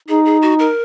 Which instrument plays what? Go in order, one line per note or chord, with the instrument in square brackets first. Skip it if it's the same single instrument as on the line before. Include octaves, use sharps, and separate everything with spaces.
[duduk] D#4 [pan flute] G#4
[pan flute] G#4
F#4
A#4